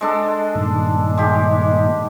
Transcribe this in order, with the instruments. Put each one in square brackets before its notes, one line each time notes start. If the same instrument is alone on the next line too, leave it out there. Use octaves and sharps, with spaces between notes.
[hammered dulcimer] G#3 D4 A4
[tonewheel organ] G2 A#2 D#3
[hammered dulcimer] G#3 G4